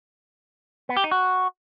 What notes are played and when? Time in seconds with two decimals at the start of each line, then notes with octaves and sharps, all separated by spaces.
0.89 B3
0.97 G4
1.04 D#4
1.11 F#4